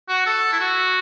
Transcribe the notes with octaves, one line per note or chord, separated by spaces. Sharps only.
F#4
A4
E4
F#4